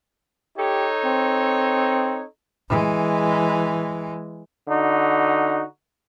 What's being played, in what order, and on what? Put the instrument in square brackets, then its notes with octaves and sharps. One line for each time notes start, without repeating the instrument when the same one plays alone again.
[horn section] D#4 A4 C#5 [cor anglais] G4
[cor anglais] C4
[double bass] E3 G#3
[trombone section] D3 D#4 F#4